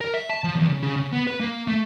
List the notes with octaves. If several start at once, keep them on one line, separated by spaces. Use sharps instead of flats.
A#4
E5
A5
F3
E2
C#3
C#3
C#3
B3
B4
A#3
A3